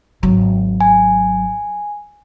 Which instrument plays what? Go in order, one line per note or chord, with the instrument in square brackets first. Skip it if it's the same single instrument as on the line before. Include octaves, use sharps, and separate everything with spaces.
[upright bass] G#1 F#3
[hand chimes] G#5